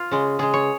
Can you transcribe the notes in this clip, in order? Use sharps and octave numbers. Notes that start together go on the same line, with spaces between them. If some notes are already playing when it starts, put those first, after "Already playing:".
Already playing: F4
C#3 G#3
C#3 G#3 G#4
C#5